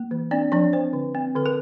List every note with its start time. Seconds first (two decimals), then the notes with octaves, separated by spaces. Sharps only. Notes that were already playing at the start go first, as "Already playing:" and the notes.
Already playing: A#3
0.11 E3
0.31 C4 D4 D5
0.52 F3 D4 D5
0.73 C4 C5
0.93 D3
1.15 C4
1.35 D3 A4
1.46 A#4